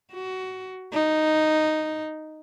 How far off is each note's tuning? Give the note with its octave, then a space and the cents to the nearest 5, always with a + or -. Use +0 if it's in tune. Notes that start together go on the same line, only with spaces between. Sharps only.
F#4 +20
D#4 -5